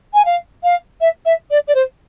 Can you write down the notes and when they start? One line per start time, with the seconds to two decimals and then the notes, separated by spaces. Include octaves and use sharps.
0.13 G#5
0.25 F5
0.63 F5
1.00 E5
1.25 E5
1.50 D5
1.67 D5
1.74 C5